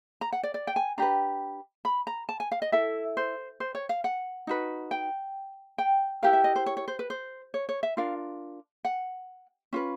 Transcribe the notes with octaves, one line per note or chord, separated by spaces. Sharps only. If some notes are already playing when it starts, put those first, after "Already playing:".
A#5
F#5
D5
D5
G5
G#5
D4 G4 B4 A#5
B5
A#5
A5
G#5
F5
D#5
E4 A4 E5
C5
C5
C#5
F5
F#5
D#4 F#4 B4
G5
G5
E4 G4 A#4 F5
E5
D#5
C5
C#5
C#5
C5
B4
C5
C#5
C#5
E5
D4 F4 A#4 F5
F#5
C#4 F4 B4